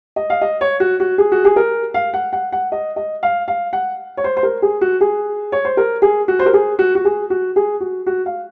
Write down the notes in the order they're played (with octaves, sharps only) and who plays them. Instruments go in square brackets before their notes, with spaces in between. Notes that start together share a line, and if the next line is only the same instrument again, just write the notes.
[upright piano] D#5
F5
D#5
C#5
F#4
F#4
G#4
F#4
G#4
A#4
F5
F#5
F#5
F#5
D#5
D#5
F5
F5
F#5
C#5
C5
C5
A#4
G#4
F#4
G#4
C#5
C5
A#4
G#4
F#4
C5
A#4
G#4
F#4
F#4
G#4
F#4
G#4
F#4
F#4
F5